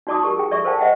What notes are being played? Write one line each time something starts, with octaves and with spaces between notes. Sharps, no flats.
D#4 F#4 D5 A5 D6 D#6
G4 A#4 C#6
G#4 G5
A4 D5 E5 C#6
A#4 C5 D5 F5 G5 A5
C5 D#5 E5 F#5 G5